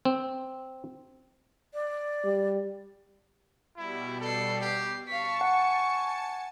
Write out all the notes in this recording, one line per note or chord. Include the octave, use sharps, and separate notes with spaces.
C4
D5
G3
B2 G3 E4
A4 D5 C7
G4 C7
F5 A5 C#6 B6 C#7
F#5 G#5